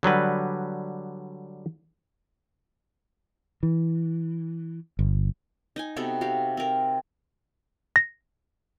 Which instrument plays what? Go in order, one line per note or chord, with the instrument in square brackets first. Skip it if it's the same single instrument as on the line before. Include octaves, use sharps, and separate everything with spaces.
[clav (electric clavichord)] D3 F#3 G3 B4
[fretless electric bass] E3
G1
[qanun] D#4 D#5 G#5
C3 B3 F#4 A4
F#4 G4 F5
C4 A#4
[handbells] A#6